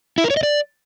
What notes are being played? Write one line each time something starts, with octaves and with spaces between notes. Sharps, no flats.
E4
A#4
C#5
D#5
D5